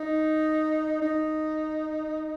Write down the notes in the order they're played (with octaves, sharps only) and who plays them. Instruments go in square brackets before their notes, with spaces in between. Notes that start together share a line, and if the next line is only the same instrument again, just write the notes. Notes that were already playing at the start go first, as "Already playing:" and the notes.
Already playing: [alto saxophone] D#4
D#4